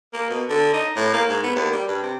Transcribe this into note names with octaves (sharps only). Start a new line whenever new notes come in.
A#3
B2
D3
D#4
A2
A#3
G#2
B3
D#2
G3
G2
C3